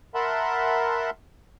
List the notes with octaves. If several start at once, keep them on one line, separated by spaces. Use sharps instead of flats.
A#4 E5 F#5 A5 B5 C6